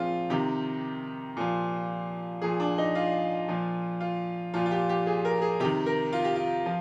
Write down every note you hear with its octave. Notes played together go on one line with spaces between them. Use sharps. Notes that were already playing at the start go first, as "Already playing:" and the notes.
Already playing: A#2 F3 G#3 C4 F4
C3 D#3 G4
A#2 F3
A#2 F3 G#4
D4
D#4
F4
A#2 F3
F4
A#2 F3 F4
F4
G4
G4
G#4
A#4
G#4
C3 D#3 G4
A#4
F4
G4
F4
F3